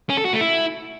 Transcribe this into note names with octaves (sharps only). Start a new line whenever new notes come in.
C#4
A4
F#4
A3
E4